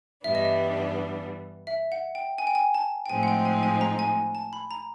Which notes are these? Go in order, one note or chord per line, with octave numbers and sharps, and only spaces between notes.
G2 E3 G3 B3 D4 E5
D#5
E5
E5
F#5
G5
G#5
G5
G#5
A5
G5
A2 F3 G#3 C4 D#4 G#5
F#5
G5
G#5
G#5
A#5
G#5
A5
B5
A#5